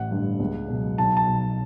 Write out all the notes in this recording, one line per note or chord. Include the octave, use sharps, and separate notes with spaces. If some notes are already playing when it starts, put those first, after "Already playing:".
Already playing: A1 F#5
G2 D3
C#2
B2 F#3
B1 A5
A5
B2 F#3